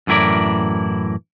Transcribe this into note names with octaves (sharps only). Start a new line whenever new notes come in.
F#2 A2 E3 E4 A#4 D5